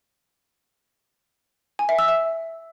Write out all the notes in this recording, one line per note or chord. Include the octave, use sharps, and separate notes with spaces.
G#5
E5
E6
E5